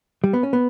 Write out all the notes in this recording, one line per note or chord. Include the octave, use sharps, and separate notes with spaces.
G3
B3
C#4
B3